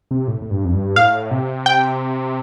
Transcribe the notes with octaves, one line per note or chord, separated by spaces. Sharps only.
C3
A2
A2
G2
F2
G2
A2 F5
C3
G5